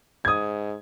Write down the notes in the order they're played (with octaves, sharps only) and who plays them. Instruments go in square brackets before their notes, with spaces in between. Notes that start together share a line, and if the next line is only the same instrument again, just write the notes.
[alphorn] G#2 [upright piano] D#6 G#6